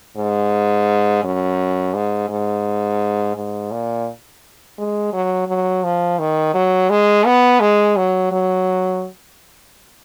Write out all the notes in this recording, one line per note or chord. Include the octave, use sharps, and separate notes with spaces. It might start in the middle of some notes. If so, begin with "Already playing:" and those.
G#2
F#2
G#2
G#2
G#2
A#2
G#3
F#3
F#3
F3
D#3
F#3
G#3
B3
G#3
F#3
F#3